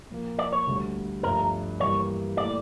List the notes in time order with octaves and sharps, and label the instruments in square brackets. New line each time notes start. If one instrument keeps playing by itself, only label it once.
[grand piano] A#2 F3 A#3
[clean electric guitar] D5
C#5
[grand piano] D2 D3 G3
[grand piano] G1 G2 F3 A3 D4 [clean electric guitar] A#4
[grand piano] G2 E3 G3 A#3 [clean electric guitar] C#5
[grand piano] A#2 A3 E4 [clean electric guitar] D5